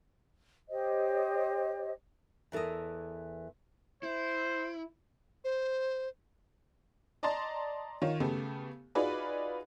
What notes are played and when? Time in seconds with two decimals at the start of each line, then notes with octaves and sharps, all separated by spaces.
0.70 G4 C5 C#5 D#5
2.52 E2 E3 A4 A#4 D#5
4.03 E4 C5
5.44 C5
7.23 D5 D#5 A5 A#5 C6 A6
8.02 D#3 F4 C#5
8.20 C#3 A3 B3 G4 A4
8.95 D#4 F4 F#4 G#4 B4 D5